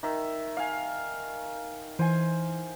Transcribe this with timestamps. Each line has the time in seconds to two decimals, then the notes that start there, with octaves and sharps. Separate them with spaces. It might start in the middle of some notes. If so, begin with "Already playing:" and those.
0.03 D#3 E5
0.57 F5 G#5
1.99 E3 C5 G#5